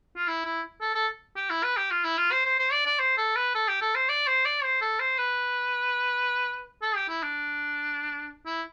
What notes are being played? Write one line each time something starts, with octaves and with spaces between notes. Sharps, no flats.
F4
E4
E4
A4
A4
G4
E4
B4
G4
F4
E4
F4
C5
C5
C5
D5
D5
C5
A4
B4
A4
G4
A4
C5
D5
C5
D5
C5
A4
C5
B4
A4
G4
E4
D4
E4